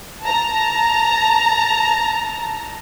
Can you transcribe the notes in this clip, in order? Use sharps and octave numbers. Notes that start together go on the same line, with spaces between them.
A5 A#5